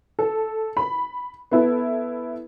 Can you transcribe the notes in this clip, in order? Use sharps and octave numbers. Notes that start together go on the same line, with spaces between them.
A4
B5
B3 E4 A4